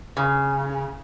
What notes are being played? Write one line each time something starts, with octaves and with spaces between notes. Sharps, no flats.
C#3